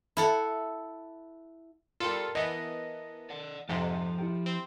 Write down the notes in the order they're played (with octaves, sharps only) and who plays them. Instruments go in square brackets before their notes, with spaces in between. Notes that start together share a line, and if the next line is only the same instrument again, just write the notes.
[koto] E4 A4 F#5
[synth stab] G3 A4 [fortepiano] F4 [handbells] A#4 A5
[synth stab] E3 B3 [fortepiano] D#5
[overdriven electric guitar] D5 F#5
[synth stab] F2 G#2 C3 [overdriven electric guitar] F3 [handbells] F#5
[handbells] E4 G4 G5
[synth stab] C4